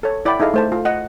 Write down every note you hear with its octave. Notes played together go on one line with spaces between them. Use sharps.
A4 C#5
E4 D5 F#5 G5 B5
D#4 E4 G#4 A4 D#5 F5
A3 C5 A5
F4
D#5 F#5